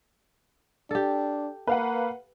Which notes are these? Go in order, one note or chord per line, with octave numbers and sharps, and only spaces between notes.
D4 G4 A4
A#3 B4 F5 F#5